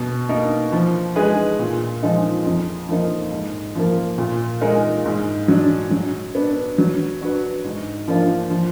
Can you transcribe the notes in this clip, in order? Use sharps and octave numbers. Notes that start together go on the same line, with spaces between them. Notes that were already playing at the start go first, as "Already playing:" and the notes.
Already playing: B2
A#3 D#4 A#4
F3
G#3 D#4 G#4 B4
A#2
F3 G#3 D#4
F2
F3 A#3 D#4
G#2
F3 A#3
A#2
G#3 D#4 A#4
G#2
F#3 D4
F#3
B3 D4
F#3
D4 F#4 B4
G#2
F3 A#3 D4 F4
F3